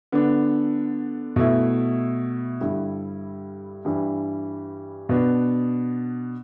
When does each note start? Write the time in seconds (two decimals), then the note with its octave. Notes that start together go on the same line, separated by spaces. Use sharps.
0.12 D3 B3 D4
1.36 B2 A3 E4
2.60 G2 D3 G3 E4
3.85 G2 E3 G3 D4
5.09 B2 B3 D4